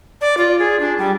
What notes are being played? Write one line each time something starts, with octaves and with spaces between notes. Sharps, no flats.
D5
F4
G#4
D4
G3